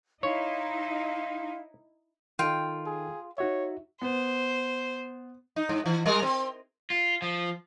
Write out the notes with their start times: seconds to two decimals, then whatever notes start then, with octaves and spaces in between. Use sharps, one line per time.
0.23 D#4 E4 C#5 F5 C6
2.39 D#3 D#4 F4 A4 G5
2.86 G#4
3.38 D#4 F#4 C#5 E5
4.02 B3 C5
5.56 D#4
5.69 G#2
5.86 E3
6.06 G3 G#3 A#4
6.22 C4
6.90 F4
7.22 F3